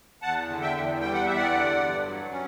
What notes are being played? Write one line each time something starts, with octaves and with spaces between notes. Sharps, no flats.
E2 F#5 A5
D3
E5 G5
E2
G3 G5
F#5
E2 E5
D5 F#5
D3
G2
F#3
C#4